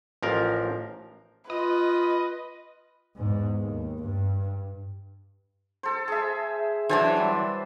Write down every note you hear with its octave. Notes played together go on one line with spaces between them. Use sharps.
A1 F3 A#4
F4 B4 D#5
E2 G#2
D#2
G2
A4 C5
G#4 E5
E3 F#3 D4 C5 G#5 A5
G3